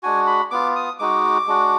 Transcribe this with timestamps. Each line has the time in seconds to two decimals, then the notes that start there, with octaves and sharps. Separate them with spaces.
0.03 G#3 D4 F#4 G#5
0.27 B5
0.51 B3 F4 D6
0.76 D#6
0.99 G#3 D#4 F#4 D6
1.48 G#3 D4 F#4